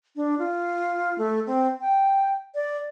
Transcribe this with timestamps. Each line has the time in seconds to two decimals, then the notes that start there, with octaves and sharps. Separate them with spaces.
0.16 D4
0.39 F4
1.18 A3
1.47 C4
1.81 G5
2.55 D5